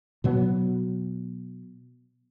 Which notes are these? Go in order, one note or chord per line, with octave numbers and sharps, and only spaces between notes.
B2 F#3 B3